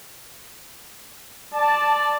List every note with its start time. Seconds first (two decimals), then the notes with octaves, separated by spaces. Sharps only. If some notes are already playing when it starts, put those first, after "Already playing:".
1.54 D5 A5